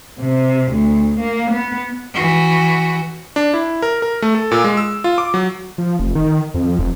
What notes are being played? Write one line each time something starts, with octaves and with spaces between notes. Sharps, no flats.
C3
D2
A#3
B3
E3 F#4
D4
E4
A#4
A#4
A3
A4
A#2
G#3
E6
F4
D6
F#3
F3
F1
D#3
F2
F1